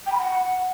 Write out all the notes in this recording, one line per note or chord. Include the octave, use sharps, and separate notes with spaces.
G5
B5
F#5